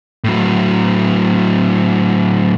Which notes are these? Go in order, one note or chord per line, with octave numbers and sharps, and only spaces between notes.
A2 F#3